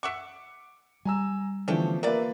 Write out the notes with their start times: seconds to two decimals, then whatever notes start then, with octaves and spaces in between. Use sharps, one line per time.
0.03 E5 F#5 C#6 D6 C#7
1.05 G3 G#5 A#5 E6
1.68 D3 E3 F3 A3 B3 C#4 D4 G4
2.03 C3 A#3 F4 A#4 B4 D5 E5